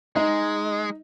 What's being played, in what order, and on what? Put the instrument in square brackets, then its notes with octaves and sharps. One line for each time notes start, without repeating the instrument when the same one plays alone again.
[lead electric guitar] G#3 [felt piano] D#4 D#5